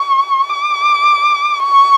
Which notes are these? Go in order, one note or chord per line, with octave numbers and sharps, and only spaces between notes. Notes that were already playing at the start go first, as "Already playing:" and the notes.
Already playing: C#6
D6
C#6